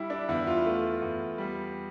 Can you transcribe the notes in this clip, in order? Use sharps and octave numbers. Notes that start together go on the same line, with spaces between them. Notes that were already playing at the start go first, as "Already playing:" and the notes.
Already playing: G3 E4
D4
E2 E4
F4
A3
E2
G3